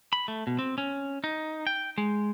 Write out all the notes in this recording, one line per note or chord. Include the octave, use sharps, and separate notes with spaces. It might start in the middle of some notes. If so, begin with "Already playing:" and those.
B5
A3
B2
C4
C#4
D#4
G5
G#3